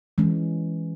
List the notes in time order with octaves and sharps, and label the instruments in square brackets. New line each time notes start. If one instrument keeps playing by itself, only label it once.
[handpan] E3 G#3 C#4